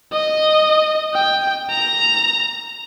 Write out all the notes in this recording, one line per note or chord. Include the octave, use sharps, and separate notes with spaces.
D#5
G5
A#5